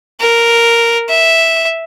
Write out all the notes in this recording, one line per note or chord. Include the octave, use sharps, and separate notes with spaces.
A#4
E5